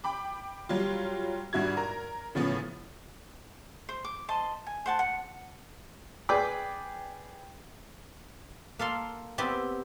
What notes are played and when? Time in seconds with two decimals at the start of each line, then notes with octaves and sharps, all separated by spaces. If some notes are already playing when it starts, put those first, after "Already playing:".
0.04 G5 B5 D6
0.69 F#3 G3 F4
1.53 G#1 G2 E4 F#4 G#6
1.77 A#4 A#5
2.35 A2 C#3 F3 B3 C#4
3.89 C5
4.05 D6
4.28 C5 D#5 A5 C6
4.66 G#5
4.86 C5 F#5 A5
4.99 F#5
6.29 G#4 B4 D5 G5 D6
8.79 A#3 A4 F5 C6
9.38 B3 C4 E4 G4 D5